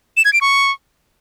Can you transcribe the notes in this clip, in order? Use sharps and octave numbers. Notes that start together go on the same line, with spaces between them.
E7
G#6
D7
C#6